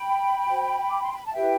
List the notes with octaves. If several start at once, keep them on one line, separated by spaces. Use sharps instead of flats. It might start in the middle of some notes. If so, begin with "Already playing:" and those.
Already playing: G5 B5
F#4 C5
D6
C6
B5
A5
E4 G4 B4 E5 G5